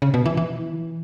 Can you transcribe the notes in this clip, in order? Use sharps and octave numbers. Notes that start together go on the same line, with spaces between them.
C#3
B2
E3
E3